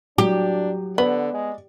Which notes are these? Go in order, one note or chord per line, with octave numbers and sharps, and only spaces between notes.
F#3 D4 G4
D3 B3 D5
G#3